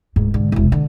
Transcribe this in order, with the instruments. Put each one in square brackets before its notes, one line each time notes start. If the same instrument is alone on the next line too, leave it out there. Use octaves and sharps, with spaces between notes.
[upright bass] D1 G#2
G#2 D3
E1 C2
D3